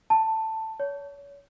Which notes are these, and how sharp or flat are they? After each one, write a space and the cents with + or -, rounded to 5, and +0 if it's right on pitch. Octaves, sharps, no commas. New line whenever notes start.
A5 +10
C#5 +35